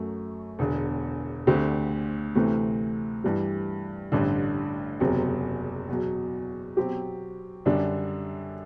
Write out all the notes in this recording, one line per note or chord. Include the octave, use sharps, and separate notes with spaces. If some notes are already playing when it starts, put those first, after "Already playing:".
Already playing: F#2 F#3 A3
E1 E2 D3
D2 D3 A3 C4 G4
D2 C3 E3 A3
G2 E3 G3
A1 G2 D3
F#1 E2 C3 F#3
E2 B2 F#3
B2 F#3 C4 G4
F#2 D3 G3 D4